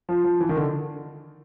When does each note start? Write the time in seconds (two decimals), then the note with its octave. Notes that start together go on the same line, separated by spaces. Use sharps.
0.09 F3
0.24 F3
0.40 E3
0.49 D#3
0.57 D3